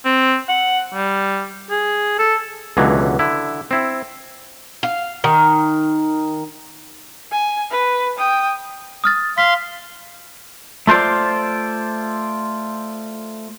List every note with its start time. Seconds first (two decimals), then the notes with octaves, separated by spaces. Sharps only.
0.05 C4
0.49 F#5
0.94 G3
1.71 G#4
2.19 A4
2.77 C#2 B2 D3 E3 F#3
3.19 D3 E4
3.71 C4 E4
4.83 F5
5.24 D#3
7.32 G#5
7.71 B4
8.18 G5 D#6
9.04 D#6 F6 A6
9.38 F5 C6 B6
10.87 A3 F4 C5 D5